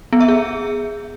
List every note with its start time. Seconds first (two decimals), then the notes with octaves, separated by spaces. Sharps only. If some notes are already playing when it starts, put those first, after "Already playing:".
0.13 B3
0.21 E5
0.28 G#4